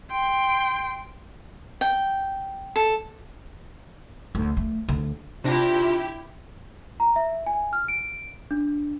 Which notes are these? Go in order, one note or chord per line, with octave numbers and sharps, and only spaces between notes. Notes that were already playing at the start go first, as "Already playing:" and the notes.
G5 C6
G5
A4
D2
A3
D2
C3 D4 E4 F4 G4 A#6
A#5
E5
G#5
F6
D7
D4